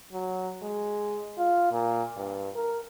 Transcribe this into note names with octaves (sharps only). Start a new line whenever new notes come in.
F#3
G#3
F4
A#2
G2
A#4